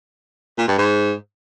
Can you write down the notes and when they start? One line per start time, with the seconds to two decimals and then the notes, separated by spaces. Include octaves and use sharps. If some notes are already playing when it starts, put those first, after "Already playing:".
0.58 A#2
0.68 G2
0.78 G#2